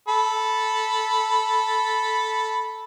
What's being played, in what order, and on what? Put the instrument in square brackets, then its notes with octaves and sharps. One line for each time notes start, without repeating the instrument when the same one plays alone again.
[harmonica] A4 B5